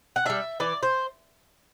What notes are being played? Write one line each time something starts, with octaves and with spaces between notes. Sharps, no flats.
F#5
G3 D4 E5
E3 D5
C5